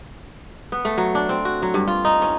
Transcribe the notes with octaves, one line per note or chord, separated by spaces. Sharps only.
B3
A3
F#3
D4
C4
F#4
F#3
G2
F4
D#4
C#4